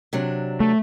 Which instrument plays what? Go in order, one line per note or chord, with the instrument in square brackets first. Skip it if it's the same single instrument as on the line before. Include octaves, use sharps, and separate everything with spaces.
[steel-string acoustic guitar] C3 F#3 D4
[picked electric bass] A3